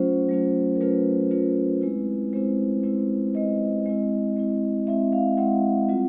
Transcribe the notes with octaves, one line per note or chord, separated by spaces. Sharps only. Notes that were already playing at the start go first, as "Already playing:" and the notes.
Already playing: F#3 A3 C#4 F4 C5
F#3 A3 C#4 F4
A#4
F#3 A3 C#4 F4 B4
F#3 A3 C#4 F4
G#3 C4 E4
G#3 C4 E4 C5
G#3 C4 E4
G#3 C4 E4 D#5
G#3 C4 E4
G#3 C4 E4
G#3 C4 E4 E5
F5
G#3 C4 E4 F#5
G3 C4 F4